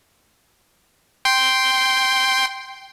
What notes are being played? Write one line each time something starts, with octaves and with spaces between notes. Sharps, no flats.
G5 C6